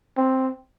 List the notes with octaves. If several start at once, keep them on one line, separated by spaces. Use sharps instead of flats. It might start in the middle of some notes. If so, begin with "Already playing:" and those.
C4